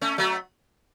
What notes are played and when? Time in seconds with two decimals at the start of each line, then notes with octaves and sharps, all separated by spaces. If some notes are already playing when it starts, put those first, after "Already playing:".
0.01 A3 C#4
0.18 F#3 A3